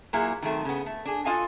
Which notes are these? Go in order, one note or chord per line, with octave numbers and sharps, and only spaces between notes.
A#2 F#3 A#3 E4 G#4
D#3 F#3 G3 A3 C4
C#3 B3
A3
D4 G#4
F4 F#4 A4 D#5 F5 G#5